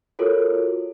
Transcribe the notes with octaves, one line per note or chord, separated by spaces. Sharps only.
F4 F#4 A4 A#4 C#5